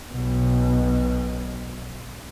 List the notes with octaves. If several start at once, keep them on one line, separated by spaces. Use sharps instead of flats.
B1 B2